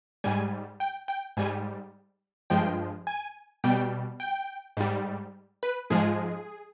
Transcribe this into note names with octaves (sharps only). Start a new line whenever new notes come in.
G#2 G3 G#5
G5
G5
G#2 G3 G#5
G2 F3 G#3 G5
G#5
B2 G3 G5
G5
G#2 G3
B4
G#2 F3 G#3 G#4